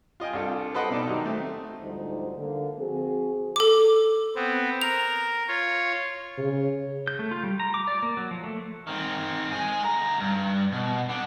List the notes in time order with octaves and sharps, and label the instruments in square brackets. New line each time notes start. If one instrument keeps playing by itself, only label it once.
[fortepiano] F4 D#5 G5 G#5
C2 D4 F4 A4
A4 B4 C5 D#5 F#5 G5
B2 D#4 D5 A5
D#3 F#3 D#4 G4
A3 C4 D#6
[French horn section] D2 G#2 F3 G3 D#4 C5
D3 A#3
F3 C4 F#4 G#4
[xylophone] A4 D6
[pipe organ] B3 C4
[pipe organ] A#4 [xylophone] F7
[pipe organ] F4 C#5
[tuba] C#3
[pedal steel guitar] G6
A3
F4
G3
A#5
D6
D5
A#3
F#3
F3
A3
[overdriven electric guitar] D#3 C4
G#3 G#4
D2 A#5
G2
B2
B3 D4